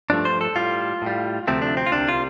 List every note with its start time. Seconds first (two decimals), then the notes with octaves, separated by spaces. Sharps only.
0.10 G2 F3 A3 D4
0.25 C5
0.41 A4
0.55 A2 G3 F4
1.02 A2 G3
1.47 D2 C3 F3 A3 C4
1.62 D4
1.77 C4
1.86 F4
1.92 C2 C3 G3 D4
2.09 F4